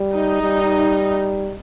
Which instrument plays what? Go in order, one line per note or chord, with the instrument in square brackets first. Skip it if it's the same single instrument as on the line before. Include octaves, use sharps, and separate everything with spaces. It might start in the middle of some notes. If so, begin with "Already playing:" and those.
Already playing: [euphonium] G3
[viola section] D#4
[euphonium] G3